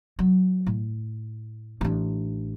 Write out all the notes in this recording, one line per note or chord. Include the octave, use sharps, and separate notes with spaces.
F#3
A2
A1 D4